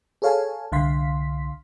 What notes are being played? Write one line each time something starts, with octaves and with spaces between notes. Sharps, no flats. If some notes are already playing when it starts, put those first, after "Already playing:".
G#4 A4 C#5 F5 G#5 A5
C2 D3 F5 C6 B6